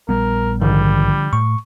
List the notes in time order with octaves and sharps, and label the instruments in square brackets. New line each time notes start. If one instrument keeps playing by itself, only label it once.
[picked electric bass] A#1 G3 B3 [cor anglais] A#4
[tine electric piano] A#1 G#2 D#3 [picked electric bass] D3 F3 [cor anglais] G3
[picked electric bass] A2 [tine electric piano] C#6